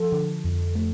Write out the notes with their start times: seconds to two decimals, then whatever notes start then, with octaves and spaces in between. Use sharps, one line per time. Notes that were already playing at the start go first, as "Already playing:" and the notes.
Already playing: F3 A4
0.12 D3
0.44 F2
0.75 A3